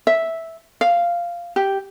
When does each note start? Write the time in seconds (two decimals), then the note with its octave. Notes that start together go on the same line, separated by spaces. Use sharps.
0.07 E5
0.81 F5
1.56 G4